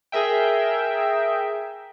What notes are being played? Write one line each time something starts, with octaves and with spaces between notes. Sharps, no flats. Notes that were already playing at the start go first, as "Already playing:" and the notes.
G#4 A#4 E5 G5